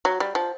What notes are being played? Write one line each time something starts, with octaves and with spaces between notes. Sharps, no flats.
F#3
G3
F3